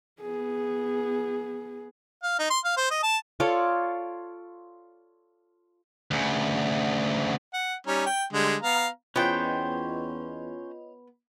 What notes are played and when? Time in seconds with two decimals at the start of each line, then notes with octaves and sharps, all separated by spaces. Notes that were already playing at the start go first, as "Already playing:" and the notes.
0.21 B3 G#4
2.23 F5
2.39 D#4
2.50 C6
2.65 F5
2.77 C5
2.91 D#5
3.03 A5
3.40 F4 A4 C#5 D5
6.11 D2 C#3
7.54 F#5
7.87 G3 C#4 D#4
8.06 G5
8.33 D3 G3 G#3
8.62 B3 F5 A#5
9.16 E2 B3 C#4 F4 C5 C#5 D#5 G5